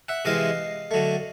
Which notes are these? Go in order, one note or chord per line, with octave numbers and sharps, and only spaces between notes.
E5 F#5
C3 E3 G#3 C4 D#5 F5
D3 F#3 A3